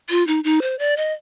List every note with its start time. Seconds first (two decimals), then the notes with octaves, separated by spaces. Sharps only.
0.10 F4
0.27 D#4
0.44 D#4
0.62 C5
0.79 D5
0.97 D#5